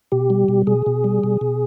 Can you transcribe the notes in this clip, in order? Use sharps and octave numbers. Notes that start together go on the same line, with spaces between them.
B2 G4
G3
B2
B2 G#4
B2
G3
B2
B2